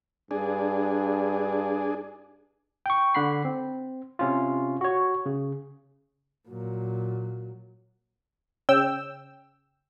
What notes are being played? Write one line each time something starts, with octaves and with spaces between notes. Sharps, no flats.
G2 D4 G#4
G5 C#6
D3 F#5 B5 C7
C4
C3 C#4 F4
F#4 C#5
C#3
A#2 F#3
C#3 G5 E6